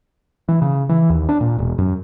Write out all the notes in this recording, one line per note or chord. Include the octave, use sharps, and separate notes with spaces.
E3
C#3
E3
D#2
D4
A#2
E1
F#2